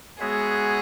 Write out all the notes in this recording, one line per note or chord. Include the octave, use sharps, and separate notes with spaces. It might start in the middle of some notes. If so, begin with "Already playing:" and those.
G#3 B3 F#4 G#4 C#5 E5